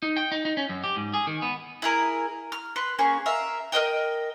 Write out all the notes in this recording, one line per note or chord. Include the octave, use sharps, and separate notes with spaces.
D#4
G5
D#4
D#4
C#4
F#2
G4
G#2
G#4
D#3
B3
E4 G#4 A#4
F6
B4 C6
A#3 C#4 G#4
A#4 E5 F5
A#4 C5 D#5 G5